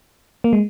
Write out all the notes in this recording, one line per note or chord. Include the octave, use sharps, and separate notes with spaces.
A#3
G#3